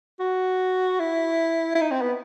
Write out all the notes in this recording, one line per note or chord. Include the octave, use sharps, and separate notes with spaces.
F#4
E4
E4
D#4
C4
B3